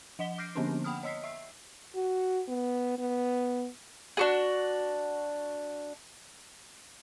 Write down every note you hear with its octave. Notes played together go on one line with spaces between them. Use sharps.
F3 D#5 F#5 B6 G7
D6 F6 G6 A#6 C7 D7
D3 F3 A#3 B3 C#4 D4
F#5 G5 B5 D#6 F6
C#5 D#5 E6 B6 C7
E5 E6 C7
F#4
B3
B3
D4 F#4 G#4